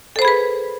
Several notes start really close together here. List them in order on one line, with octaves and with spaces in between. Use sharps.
A4 C5 B5 G#4 B4